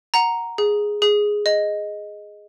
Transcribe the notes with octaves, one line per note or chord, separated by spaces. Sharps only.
F#5 A#5
G#4
G#4
D#5